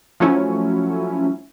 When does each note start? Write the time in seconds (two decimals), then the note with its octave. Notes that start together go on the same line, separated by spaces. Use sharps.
0.20 F3 F#3 A3 C#4 E4